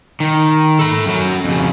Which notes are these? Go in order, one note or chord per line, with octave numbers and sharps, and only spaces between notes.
D#3
A4 B5
F#2 F#3
F2 C#3